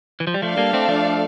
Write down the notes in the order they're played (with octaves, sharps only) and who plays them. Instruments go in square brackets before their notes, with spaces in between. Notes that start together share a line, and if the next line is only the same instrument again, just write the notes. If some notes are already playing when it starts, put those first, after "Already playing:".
[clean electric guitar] E3
F3
G3
[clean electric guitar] F3 A3 [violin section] D4 A4 D5 F5
[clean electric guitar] G3 A#3
A3 C4
F3 A3